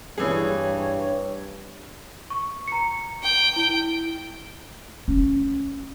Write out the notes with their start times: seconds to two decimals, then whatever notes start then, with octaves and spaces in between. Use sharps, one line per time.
0.18 G2 E3 G#4 C#5
2.30 C#6
2.68 A#5 C#7
3.23 G5
3.56 E4 D7
5.08 C#4